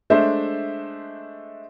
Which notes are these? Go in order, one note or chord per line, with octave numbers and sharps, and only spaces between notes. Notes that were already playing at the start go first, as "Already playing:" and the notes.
G#3 A3 D4 C5 E5